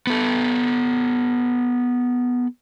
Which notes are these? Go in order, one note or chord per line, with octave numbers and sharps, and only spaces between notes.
B3 A4